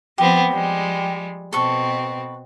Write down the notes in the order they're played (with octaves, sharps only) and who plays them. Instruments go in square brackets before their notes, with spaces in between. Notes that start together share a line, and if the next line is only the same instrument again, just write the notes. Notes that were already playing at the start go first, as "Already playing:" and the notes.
[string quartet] F3 B3 C4 [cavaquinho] G4
[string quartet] F3 G3 G#3
[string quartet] B2 C4 [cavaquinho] A4 B4 C#6